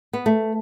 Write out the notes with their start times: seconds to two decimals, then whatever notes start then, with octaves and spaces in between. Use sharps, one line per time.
0.13 B3
0.26 A3